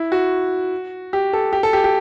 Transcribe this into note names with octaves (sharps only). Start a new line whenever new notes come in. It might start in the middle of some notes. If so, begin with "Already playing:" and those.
Already playing: E4
F#4
G4
A4
G4
A4
G4
G4